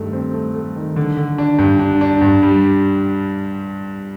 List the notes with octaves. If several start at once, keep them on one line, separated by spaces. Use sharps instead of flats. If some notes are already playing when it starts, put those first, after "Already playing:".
Already playing: G2 D#3 A3
C4
A3
A3
D#3
D3
D3
D4
G2
D4
D4
G2
G3